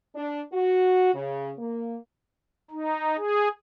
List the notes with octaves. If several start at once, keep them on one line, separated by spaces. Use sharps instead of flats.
D4
F#4
C#3
A#3
D#4
G#4